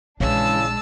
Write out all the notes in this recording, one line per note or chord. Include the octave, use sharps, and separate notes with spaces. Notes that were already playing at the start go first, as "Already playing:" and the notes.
A#1 C#3 E3 G#3 D4 A5 E6